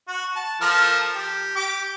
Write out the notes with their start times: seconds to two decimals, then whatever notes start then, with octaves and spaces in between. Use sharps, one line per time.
0.08 F#4
0.36 A5
0.61 F3 A4 A#4
1.15 G4
1.56 G4 D6